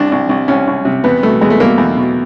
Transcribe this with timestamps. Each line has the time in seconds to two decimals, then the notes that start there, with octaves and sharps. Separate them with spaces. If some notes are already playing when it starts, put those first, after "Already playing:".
Already playing: C2 D4
0.12 C2
0.29 C2
0.48 C2 C#4
0.67 C2
0.85 C3
1.04 E2 B3
1.23 B2 A3
1.41 E2 G#3
1.50 A3
1.60 B2 A#3
1.78 E2
1.97 B2